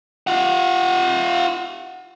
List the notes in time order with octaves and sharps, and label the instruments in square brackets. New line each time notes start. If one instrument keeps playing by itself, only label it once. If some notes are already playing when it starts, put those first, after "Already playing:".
[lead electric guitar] F4 F#5